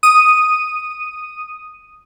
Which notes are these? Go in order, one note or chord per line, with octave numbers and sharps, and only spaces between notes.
D#6 D#7